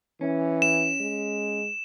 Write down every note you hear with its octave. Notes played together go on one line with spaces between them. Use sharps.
E3 C#4
E7
G#3